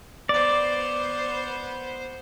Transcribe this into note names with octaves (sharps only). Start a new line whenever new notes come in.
B3 C5 D5